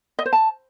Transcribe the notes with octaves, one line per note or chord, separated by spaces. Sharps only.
D#5
C5
A5